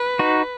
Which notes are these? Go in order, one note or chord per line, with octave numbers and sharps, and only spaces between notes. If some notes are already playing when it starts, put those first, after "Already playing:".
Already playing: B4
D#4 F#4